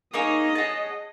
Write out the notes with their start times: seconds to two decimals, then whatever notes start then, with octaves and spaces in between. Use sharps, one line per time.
0.14 A#3 D#4 G#4 C#5 D#5
0.55 G#4 C#5 F#5 A5